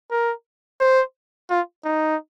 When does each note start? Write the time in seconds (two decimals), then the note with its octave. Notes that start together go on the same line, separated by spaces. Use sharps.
0.11 A#4
0.80 C5
1.50 F4
1.85 D#4